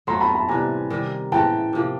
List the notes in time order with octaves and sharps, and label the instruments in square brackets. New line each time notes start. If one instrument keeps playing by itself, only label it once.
[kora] F#3 A3 C4 F4 [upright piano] A#5 C6
[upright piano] A5 B5
A5 B5
[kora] C3 E3 G3 [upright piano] G#5 A#5
[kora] C3 D#3 G3
[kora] E3 G#3 C#4 [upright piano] G5 A5
[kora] C3 F3 A#3